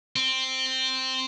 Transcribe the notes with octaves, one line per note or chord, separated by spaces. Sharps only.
C4